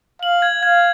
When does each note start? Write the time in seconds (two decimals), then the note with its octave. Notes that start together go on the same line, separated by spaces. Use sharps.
0.22 F5 F#7
0.42 G#6
0.63 F5 G#6